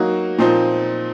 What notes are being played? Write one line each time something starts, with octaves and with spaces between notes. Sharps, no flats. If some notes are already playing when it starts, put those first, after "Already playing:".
Already playing: F#3 A#3 D#4 F#4
A#2 F3 C4 D#4